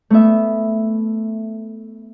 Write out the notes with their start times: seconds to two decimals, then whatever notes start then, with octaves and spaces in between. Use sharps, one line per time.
0.10 A3 B3 E5